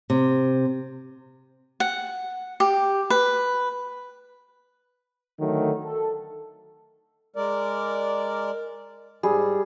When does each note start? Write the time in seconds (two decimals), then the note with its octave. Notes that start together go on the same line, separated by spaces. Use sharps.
0.10 C3
1.80 F#5
2.60 G4
3.10 B4
5.40 D3 D#3 F#3 A3
5.84 A4
7.36 G#3 A#4 D5
9.23 G#2 G3 G#4